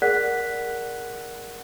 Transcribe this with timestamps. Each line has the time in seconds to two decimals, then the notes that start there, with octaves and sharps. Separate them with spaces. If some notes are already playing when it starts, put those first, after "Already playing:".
0.02 G#4 A#4 D5 F#5 F#6 B6